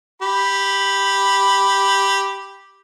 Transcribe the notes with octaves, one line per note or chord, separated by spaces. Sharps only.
G4 B5